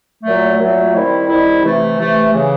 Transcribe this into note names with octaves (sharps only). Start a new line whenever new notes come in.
A#2 F#3 A3
A#2 F#3 A3
D#3 G3 C4 E4
D#3 G3 C4 E4
C3 E3 A3
C3 E3 A3
C#3 E3